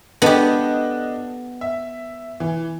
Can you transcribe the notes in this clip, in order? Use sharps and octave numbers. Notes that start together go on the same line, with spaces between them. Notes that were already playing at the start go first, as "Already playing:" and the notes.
B3 D4 G4 A4 D#5
E5
E3